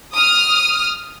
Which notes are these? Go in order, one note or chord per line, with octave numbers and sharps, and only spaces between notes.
D#6 F6